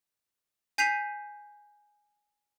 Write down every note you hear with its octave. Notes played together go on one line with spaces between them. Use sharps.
G#5 G6 B6 C7 D#7 F7